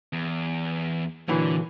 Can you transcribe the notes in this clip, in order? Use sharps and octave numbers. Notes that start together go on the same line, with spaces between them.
E2
A#2 D3 E3 F#3